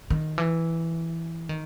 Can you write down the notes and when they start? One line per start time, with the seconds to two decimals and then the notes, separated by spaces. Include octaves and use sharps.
0.10 D#3
0.38 E3
1.49 D#3